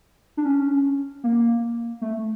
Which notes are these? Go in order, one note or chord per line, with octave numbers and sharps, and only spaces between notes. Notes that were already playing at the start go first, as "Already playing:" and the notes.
D4
C#4
A#3
A3